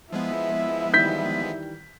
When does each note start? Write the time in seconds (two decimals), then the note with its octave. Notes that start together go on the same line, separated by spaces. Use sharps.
0.12 F3 G#3 B3 E4 E5
0.94 D#3 E3 G3 G6 B6